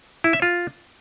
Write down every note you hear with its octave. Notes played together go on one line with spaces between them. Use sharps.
E4
E5
F4